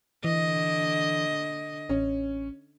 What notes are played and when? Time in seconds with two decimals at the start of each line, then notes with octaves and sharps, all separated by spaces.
0.24 D3 E3 D#5
1.89 A1 C#4